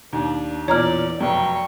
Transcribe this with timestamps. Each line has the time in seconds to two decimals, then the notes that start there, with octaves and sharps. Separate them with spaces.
0.13 D#2 D4
0.68 E2 A#2 C#5 D5 A#5 F6
1.21 F1 F#2 G5 C#6